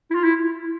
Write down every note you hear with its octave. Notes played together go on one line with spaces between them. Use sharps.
E4
F4
E4